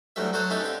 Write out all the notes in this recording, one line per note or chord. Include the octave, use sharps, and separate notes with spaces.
D2 A2 F#3 G3 A3 E5
F#3 F#4 A4 C5 C#5 F#5
A3 C#4 D#4 E4 G4 A4
D3 C4 G4